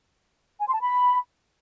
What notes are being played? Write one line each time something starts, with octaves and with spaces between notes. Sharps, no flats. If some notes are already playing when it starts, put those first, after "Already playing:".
G#5
C6
A5
B5